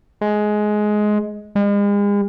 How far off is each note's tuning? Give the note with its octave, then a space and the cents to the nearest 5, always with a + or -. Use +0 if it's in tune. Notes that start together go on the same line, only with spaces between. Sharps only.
G#3 +15
G#3 -40